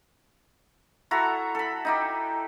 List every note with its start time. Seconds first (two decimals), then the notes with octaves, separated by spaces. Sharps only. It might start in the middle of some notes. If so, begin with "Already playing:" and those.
1.11 E4 F#4 A4 A#5
1.55 A4 B5
1.85 D#4 E4 G4